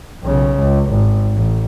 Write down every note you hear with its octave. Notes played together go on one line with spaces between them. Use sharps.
B1 C#3
C#2
G#1
A1